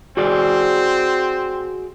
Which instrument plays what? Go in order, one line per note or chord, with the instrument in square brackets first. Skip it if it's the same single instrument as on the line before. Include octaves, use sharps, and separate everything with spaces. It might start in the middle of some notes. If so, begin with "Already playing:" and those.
[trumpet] C4 [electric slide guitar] F#4 G#4 D5